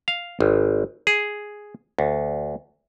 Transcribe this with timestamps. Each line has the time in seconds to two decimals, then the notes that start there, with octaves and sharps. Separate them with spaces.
0.08 F5
0.40 G#1
1.07 G#4
1.99 D2